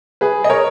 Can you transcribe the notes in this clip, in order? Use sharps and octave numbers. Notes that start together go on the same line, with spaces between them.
G#4 B4
D#5
A#4 C#5